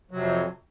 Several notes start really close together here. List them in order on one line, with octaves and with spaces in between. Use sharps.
F#3 C3 F2